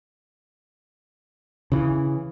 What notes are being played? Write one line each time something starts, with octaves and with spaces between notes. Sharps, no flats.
C#3 E3